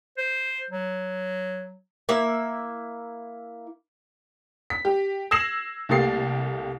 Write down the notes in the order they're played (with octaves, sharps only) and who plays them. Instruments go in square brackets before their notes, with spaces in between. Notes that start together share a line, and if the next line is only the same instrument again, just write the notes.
[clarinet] C5
F#3
[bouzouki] A#3 E4 E5
[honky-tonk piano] B6
G4
E6 G#6 A#6 C7 E7 F#7
C2 A3 A#3 G4 A6 C7